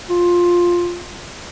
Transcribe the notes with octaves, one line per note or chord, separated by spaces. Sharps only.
F4